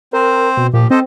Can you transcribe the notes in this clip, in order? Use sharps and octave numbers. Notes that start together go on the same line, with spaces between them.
C4 A#4 C5
B2
A#2 F3 G4
C4 A4 C5 D#5